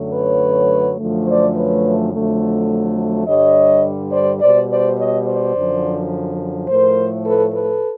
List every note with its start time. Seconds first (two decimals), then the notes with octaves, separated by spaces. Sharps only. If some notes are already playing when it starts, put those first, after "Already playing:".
Already playing: F#2 D3 F#3 A3
0.13 B4 C#5
0.99 F#2 D3 F3 A3
1.27 C5 D5
1.56 B4 C#5
2.13 F2 D3 F#3 A3
3.26 G2 D3 G3 C#5 D#5
4.12 C5 D5
4.41 B2 G3 C5 D5
4.70 C5 D5
4.98 C#5 D#5
5.26 C5 D5
5.55 F#2 D3 F3
6.68 A2 F3 A3 A#4 C5
7.26 A4 B4
7.54 A4 B4